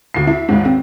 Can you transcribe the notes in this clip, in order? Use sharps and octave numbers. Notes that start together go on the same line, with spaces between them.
D2 C7
E4
G#1 D#2 G#2
C4